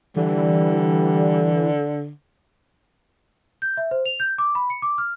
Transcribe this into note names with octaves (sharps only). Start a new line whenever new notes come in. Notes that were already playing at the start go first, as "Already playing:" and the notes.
D3 E3 G3
G6
E5
C5
F7
G6
D6
B5
C#7
D6
F6